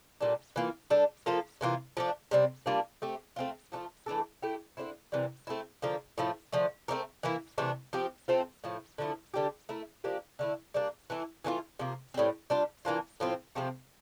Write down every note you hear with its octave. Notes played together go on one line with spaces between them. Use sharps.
A#2 G3 D4 A4
E3 A#3 F4
G3 D4 A4
F3 A#3 F4 A4
C3 E3 A#3 F4
F3 A3 D4
C3 G3 C4
G3 A#3 D4 F4
A3 C4 G4
A3 C4 F4
F3 A3 D4 F4
E3 A3 D4 A4
A3 E4 G4
D3 G3 C4 E4
C3 E3 G3 A#3
A3 C4 E4
D3 F3 A#3 F4
A2 F3 A3 E4
D3 F3 A3
A3 C4 G4 A#4
E3 A#3 E4
C3 E3 A3 D4
F3 C4 G4
A3 C4 F4 A4
A2 F3 A3
D3 F3 A3 E4
D3 G3 D4 G4
A3 E4 A#4
F3 A#3 D4 G4
D3 A3 E4
G3 A#3 D4
E3 A3 E4
E3 A3 D4 F4
C3 F3 A#3
A2 G3 C4
G3 D4 F4
E3 A#3 D4 F4
A2 F3 C4 F4
C3 F3 A3 C4